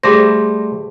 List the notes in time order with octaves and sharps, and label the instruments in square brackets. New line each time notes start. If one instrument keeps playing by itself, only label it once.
[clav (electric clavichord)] G3 A3 C5 [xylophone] G#4 D6 A#6